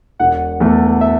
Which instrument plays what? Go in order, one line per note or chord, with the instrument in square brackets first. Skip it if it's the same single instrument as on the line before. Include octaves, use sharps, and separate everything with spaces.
[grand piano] E1 [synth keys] F#5
[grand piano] E2 E3 A3
[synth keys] E5